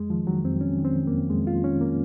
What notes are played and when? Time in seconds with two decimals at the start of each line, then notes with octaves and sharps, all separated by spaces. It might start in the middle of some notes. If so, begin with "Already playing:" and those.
Already playing: F2 G#3
0.10 D#3 F3
0.27 D#3 F#3
0.44 F2 C4
0.61 F2 C#4
0.79 D#3
0.85 C4
0.96 D#3
1.07 F2 A#3
1.30 F2 G#3
1.47 D#3 F4
1.64 D#3 C#4
1.81 A#3